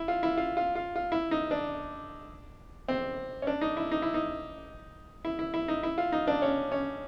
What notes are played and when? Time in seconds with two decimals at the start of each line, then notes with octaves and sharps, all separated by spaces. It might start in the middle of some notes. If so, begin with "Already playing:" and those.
Already playing: E4
0.08 F4
0.23 E4
0.37 F4
0.57 F4
0.75 F4
0.96 F4
1.12 E4
1.31 D#4
1.51 D4
2.88 C4
3.42 C#4
3.47 D4
3.61 D#4
3.77 E4
3.91 D#4
4.02 E4
4.14 D#4
5.25 E4
5.39 E4
5.54 E4
5.68 D#4
5.83 E4
5.98 F4
6.12 D#4
6.27 D4
6.42 C#4
6.72 C#4